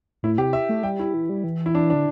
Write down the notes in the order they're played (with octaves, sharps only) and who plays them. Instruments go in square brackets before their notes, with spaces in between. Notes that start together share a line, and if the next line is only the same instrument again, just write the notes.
[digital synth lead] A2 [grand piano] E4
[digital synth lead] C3 [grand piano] G4
[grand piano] E5
[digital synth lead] A3
[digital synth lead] G3 [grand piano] G5
[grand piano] E4
[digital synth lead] E3
G3
E3
[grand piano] E4
D4
D4
[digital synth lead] D3